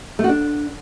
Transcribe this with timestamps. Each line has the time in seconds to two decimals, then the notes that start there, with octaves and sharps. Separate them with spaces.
0.19 A3
0.24 F#4
0.29 D4